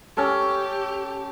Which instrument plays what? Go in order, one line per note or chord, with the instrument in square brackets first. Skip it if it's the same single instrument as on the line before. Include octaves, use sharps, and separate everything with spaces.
[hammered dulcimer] C#4 A4 [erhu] G4